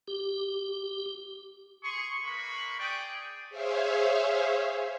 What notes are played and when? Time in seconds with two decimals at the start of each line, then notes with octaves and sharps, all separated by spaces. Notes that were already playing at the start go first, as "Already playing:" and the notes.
0.08 G4
1.83 G#4 C6 C#6
2.24 G#3 A#3 B4 B5 C#6
2.79 G#4 D5 G5
3.50 G#4 C5 C#5 E5 F5